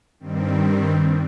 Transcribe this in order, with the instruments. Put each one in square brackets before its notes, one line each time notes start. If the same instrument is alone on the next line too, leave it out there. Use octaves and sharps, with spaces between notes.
[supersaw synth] G2 D#3 G3 C4